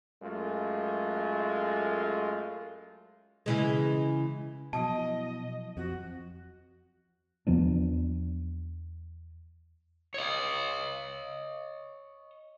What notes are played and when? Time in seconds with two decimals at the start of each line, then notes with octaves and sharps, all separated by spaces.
0.22 F#2 G#3 A3 F4
3.46 C#3 E3 G#3
4.73 B2 F3 F#3 E4 D#5 A5
5.77 F2 F#4
7.47 E2 F3 B3 D4
10.14 C#5 D#5